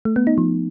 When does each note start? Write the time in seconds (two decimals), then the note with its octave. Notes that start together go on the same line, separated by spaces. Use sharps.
0.05 A3
0.16 B3
0.27 D#4
0.38 F3